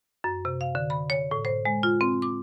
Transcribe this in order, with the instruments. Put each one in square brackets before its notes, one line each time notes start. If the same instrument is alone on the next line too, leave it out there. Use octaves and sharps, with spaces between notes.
[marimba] F#2
C3
F5
D3
B5
C#5
A2
C5
G#3
F4
C4
D6